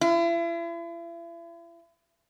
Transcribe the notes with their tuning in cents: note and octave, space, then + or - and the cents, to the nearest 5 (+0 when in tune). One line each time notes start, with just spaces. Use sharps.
E4 +40